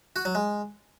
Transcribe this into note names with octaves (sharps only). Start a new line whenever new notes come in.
F#4
F#3
G#3